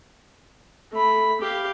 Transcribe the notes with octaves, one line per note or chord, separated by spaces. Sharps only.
A3 B5
G4 F5